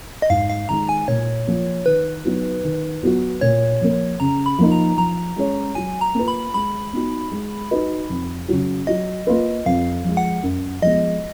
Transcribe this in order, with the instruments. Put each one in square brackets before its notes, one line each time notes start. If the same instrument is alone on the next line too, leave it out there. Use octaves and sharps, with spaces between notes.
[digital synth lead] D#5
[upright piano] G#2 [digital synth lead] F5
[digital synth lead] F5
[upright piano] D#3 G#3 D#4 [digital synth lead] A#5
[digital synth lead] G#5
[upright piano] A#2 [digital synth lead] C#5
[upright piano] F3 A#3 F4
[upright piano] D#3 [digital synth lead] B4
[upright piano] F#3 B3 D#4
D#3
F#3 B3 F#4
[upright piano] A#2 [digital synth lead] C#5
[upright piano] F3 A#3
[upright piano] C#3 [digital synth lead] A#5
[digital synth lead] B5
[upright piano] F3 A#3 D#4
[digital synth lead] A#5
[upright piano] F3 [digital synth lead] A#5
[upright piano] G#3 C#4 G#4 C#5
[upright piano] F#3 [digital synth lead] G#5
[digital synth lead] A#5
[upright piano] A#3 F4 B4
[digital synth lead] B5
[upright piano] G#3 [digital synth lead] B5
[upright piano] B3 D#4 F#4
G#3
D#4 F#4 B4 D#5
F2
C#3 F#3
[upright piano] F#3 [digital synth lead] D#5
[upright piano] A#3 F4 B4
[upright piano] F2 [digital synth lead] F5
[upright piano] F3 G#3
[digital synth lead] F#5
[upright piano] F#2
[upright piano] F3 G#3 B3 [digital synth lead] D#5